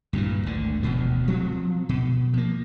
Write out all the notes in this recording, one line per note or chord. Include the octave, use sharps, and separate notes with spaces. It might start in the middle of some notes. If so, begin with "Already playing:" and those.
G2 A#2 D3 E3
G#1 D2 D3
E1 D2 B2 F3
F3 F#3 C4
B2
F3 A#3